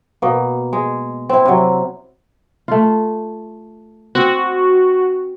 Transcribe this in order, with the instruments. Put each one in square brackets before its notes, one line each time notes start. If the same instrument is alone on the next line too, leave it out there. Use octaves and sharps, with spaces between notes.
[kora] B2 A#3
G#3
C4 E4
C3 F#3
A3 F4
[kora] C4 [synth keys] F#4